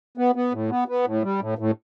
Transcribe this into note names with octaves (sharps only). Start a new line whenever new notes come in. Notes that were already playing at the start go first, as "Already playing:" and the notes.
B3
B3
A2
B3
B3
A2
G3
A2
A2